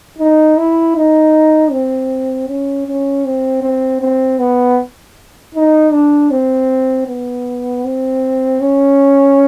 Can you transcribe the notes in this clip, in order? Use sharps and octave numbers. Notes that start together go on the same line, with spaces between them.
D#4
E4
D#4
C4
C#4
C#4
C4
C4
C4
B3
D#4
D4
C4
B3
C4
C#4